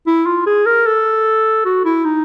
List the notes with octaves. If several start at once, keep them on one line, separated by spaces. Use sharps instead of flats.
E4
F4
G#4
A#4
A4
F#4
E4
D#4